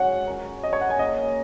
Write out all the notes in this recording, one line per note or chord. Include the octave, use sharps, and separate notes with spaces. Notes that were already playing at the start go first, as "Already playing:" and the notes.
Already playing: G#2 F#3 C#4 F#4 F#5
F#3 C#4 F#4 A#4
D#5
C#5
F#5
G#5
C#3 A#3 C#4 D#5